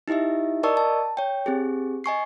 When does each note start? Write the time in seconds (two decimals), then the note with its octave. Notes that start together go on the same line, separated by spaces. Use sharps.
0.08 D#4 E4 G4 D#5 E5
0.63 A#4 D5 D#5 A5 C#6 E6
0.77 A5
1.17 C#5 G5
1.46 C4 G4 G#4
2.04 D#5 G#5 C#6 C7